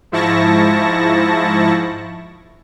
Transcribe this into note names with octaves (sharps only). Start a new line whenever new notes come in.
G#2 F3 E4 A5 C#6 A#6